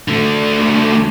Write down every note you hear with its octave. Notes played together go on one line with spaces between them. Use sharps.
D3 A3